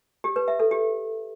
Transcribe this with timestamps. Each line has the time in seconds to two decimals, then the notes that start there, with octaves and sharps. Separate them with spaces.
0.24 G4
0.36 B4
0.48 E5
0.60 A4
0.71 G4